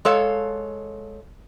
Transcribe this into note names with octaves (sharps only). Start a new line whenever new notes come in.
G#3 A4 C#5 F5